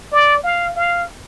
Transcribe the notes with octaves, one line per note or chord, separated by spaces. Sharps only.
D5
F5
F5